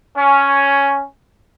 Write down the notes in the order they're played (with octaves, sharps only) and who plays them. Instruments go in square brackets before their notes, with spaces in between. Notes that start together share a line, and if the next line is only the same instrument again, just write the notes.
[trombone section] C#4